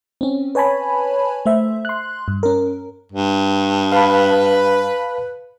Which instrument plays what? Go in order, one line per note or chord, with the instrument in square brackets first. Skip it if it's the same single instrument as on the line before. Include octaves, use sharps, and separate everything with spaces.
[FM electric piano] C4 C#4
B4 C#5 G#5 A5 B5
A3 C5 E5
C6 F#6
G2
C#4 A#4
[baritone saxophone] G2
[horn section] B4 [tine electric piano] F5 A5 B5